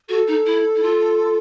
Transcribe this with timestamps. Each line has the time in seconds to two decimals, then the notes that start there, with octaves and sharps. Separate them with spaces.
0.09 F#4 A4
0.28 D#4 A4
0.46 E4
0.76 E4
0.83 F4